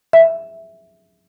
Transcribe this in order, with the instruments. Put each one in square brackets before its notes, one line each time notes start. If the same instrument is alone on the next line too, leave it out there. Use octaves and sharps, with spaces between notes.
[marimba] E5